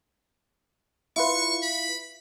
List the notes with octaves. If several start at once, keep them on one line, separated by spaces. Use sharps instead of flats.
E4 F4 B4 C#6
B5